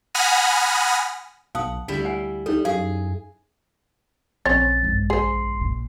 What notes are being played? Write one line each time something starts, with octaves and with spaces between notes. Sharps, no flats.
F#5 G#5 B5 D#6 F6 A#6
B1 F5 F#5 A5 D#6
D2 G3 E4 E5
F#5 G#5
G3 D#4 A4
F#2 G#4 F5
A#1 C4 C#4 C#5 A6
G1 G#3
G#4 C5 C6 C7
A#2